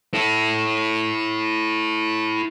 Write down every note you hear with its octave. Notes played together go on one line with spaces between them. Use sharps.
E4 A4